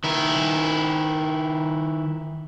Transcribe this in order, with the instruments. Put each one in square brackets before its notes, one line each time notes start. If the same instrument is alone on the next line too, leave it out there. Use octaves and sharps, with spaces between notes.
[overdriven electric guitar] D#3 E4